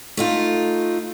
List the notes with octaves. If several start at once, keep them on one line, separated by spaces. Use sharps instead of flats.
A3 D#4 F4